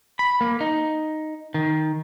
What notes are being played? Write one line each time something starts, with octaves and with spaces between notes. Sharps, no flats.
B5
A#3
D#4
D#3